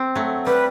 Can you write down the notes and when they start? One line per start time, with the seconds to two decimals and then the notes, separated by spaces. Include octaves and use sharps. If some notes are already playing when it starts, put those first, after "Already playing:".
Already playing: C4
0.15 F#3 A3
0.46 G3 B4